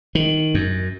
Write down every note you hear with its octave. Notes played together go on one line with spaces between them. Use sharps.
D#3
F#2